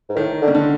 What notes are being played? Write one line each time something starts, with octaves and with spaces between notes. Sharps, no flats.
G#2
A2 D#3
D3
C#3
D3